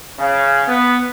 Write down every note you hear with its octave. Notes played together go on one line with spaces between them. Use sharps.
C#3
B3